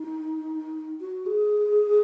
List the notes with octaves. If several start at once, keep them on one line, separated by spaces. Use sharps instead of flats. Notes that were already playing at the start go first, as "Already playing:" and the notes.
Already playing: D#4
F#4
G#4